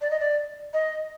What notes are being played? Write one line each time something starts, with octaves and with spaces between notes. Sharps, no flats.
D5
D#5
D5
D#5